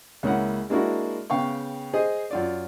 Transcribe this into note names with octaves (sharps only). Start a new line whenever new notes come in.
C#2 A#3 C#4 E4 F#5
G#3 A#3 D4 E4 F#4
C#3 B3 F5 G5 C#6
G#4 C5 D#5
F#2 F4 D5